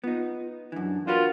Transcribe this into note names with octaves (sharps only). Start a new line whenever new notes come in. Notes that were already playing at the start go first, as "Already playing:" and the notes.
B3 D#4 F4
F#2 E3 D4
D4 F4 F#4 A#4 B4